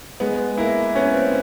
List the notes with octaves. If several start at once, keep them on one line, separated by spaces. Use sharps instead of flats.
G#3 B3
A#3 E4
B3 C#4
C4